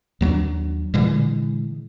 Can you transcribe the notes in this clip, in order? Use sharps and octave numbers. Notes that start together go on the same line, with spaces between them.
D#2 F#3 G#3 D4
A#2 D3 E3 G#3